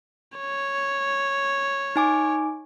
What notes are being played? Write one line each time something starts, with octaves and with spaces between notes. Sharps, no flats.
C#5
D#4 G#5 D6